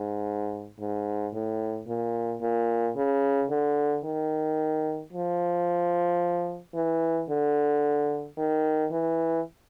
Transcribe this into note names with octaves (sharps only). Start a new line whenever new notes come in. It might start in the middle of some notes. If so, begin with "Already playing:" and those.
Already playing: G#2
G#2
A2
A#2
A#2
C#3
D3
D#3
F3
E3
D3
D#3
E3